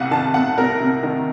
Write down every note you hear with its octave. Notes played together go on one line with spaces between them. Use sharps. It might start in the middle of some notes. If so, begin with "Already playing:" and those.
Already playing: C2 C3 F5 F#5
D#3 A5
C2 F#5
C2 A#4
C3
D#3